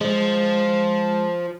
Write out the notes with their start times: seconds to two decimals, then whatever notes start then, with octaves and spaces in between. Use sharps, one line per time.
0.01 F3 G#3